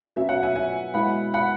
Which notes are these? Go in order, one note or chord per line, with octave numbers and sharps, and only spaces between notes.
B2 F#3 C#4 E5
C#5 F#5
E5 G#5
E5 G#5
B2 G#3 E4 F#5 B5
F#5 B5